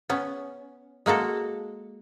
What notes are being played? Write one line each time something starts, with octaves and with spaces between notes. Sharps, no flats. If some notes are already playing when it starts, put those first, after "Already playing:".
B3 C#4
G#3 A#3 F#4 A4